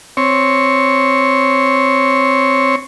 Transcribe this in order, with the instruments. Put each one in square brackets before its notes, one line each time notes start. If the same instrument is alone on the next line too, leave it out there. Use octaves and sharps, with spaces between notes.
[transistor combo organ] C4 C#5